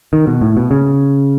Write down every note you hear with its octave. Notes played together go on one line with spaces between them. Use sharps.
D#3
B2
A2
B2
C#3